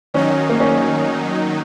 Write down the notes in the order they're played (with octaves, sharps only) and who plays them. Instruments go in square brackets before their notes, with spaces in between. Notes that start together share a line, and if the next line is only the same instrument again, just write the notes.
[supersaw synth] D#3 F#3 D#4 [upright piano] C#4
[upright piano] A#3
C#4